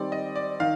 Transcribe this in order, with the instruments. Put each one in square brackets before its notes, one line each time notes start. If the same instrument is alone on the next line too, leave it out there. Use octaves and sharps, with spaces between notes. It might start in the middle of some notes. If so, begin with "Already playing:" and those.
Already playing: [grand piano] D#3 G3 C4 [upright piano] D5
[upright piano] D#5
D5
[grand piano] D#3 [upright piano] F5